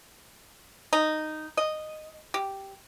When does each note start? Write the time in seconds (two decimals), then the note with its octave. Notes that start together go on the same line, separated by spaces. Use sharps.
0.93 D#4
1.57 D#5
2.34 G4